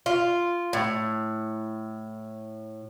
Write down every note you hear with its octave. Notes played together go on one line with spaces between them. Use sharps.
F4
A2